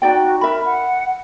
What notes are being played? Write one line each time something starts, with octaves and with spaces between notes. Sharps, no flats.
D#4 F#4 D5 G5
A#4 E5 B5
F#5